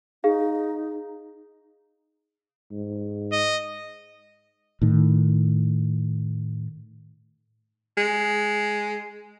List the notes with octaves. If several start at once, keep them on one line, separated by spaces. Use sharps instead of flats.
D#4 G#4 F5
G#2
D#5
A2 D#3
G#3